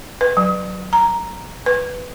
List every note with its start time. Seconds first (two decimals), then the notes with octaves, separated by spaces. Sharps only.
0.21 B4
0.37 F#3
0.93 A#5
1.66 B4